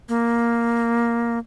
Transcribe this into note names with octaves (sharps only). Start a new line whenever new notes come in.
A#3